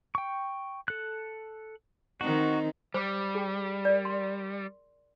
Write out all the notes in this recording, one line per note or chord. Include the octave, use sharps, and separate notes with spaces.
G5 C#6
A4 F#6
D#3 C4 D#4 F#4
G3 C5 D6
G#4 G5
A#4 D5
C6